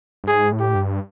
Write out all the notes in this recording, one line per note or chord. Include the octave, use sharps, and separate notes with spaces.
G2
G#2 G#4
A2
G4
G2